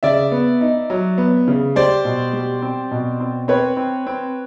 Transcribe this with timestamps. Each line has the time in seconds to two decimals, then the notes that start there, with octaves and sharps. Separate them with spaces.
0.03 C#3 D5 E5
0.32 B3
0.61 D#4
0.90 F#3
1.18 B3
1.48 C#3
1.76 G3 C5 D5
2.05 B2
2.33 G3
2.62 C4
2.91 B2
3.20 C4
3.48 C4 B4 C#5
3.77 C4
4.07 C4